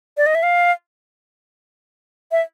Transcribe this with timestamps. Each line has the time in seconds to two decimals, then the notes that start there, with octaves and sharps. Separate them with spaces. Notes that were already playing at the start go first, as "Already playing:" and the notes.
0.17 D5
0.26 D#5
0.35 E5
0.43 F5
2.32 E5